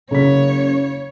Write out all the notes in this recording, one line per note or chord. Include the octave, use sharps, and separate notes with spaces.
F#1 C#3 C#5 B6